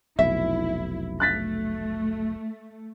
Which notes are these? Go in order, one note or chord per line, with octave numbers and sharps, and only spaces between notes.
F1 B1 E4 E5
A3 F#6 A6 B6